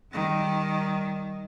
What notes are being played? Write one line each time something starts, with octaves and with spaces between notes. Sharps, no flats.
D#3 G3